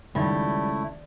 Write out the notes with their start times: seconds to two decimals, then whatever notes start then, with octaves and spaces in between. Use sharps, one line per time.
0.15 C#2 D#3 G3 A3 D#4 E4 B5